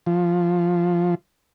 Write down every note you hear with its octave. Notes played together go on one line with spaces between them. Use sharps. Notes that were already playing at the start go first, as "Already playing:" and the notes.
F3